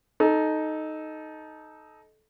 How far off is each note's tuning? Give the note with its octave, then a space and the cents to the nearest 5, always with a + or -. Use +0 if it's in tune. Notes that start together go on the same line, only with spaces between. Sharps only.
D#4 +0 A4 -20